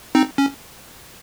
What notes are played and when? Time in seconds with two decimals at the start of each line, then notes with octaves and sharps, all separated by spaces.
0.15 C4 D#4
0.38 C#4